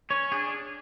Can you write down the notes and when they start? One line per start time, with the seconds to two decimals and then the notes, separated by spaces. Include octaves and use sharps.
0.10 C#4 C#5
0.32 D4 G#4